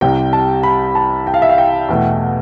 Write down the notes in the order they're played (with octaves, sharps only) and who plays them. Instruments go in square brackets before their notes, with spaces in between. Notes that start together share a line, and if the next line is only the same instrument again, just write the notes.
[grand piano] C2 C3 G3 G5
A5
B5
A5
G5
F5
E5
F5
G5
E2 B2 A3